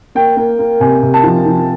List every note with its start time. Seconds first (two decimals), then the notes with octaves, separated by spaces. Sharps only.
0.15 A#3 G5
0.37 A#3
0.59 A#3
0.80 C3 G#5
1.03 C3
1.14 A5
1.24 F3
1.46 F3